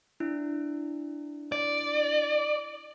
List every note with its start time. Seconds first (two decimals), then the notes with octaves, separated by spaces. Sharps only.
0.20 D4 E4
1.52 D5